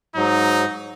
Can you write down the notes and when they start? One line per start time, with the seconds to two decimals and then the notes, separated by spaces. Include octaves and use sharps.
0.16 G#2 F#3 D#4